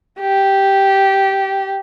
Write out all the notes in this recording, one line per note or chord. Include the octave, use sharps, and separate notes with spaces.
G4